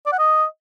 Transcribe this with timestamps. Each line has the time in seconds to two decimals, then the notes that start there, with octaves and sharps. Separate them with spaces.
0.06 D5
0.13 F#5
0.19 D#5